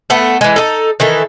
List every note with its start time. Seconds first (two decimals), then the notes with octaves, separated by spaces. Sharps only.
0.10 A3 B3 A4
0.41 E3 G#3
0.56 D#4 A4
1.00 D#3 E3 A4